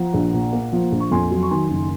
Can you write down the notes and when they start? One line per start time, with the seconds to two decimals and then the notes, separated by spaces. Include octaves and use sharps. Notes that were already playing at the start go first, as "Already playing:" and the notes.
Already playing: F3 F#5 A#5
0.14 A#1
0.33 A#2
0.53 A#3
0.72 F3
0.92 A#1
1.00 C#6
1.11 F2 G#5 C6
1.31 F#3
1.43 C#6
1.51 D#3 G#5 C6
1.70 F#1